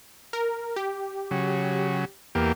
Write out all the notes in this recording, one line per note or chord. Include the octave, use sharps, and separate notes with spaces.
A#4
G4
C#3 F#3
E2 A#3 G4